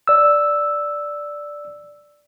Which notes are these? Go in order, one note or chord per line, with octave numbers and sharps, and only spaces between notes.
D5 E6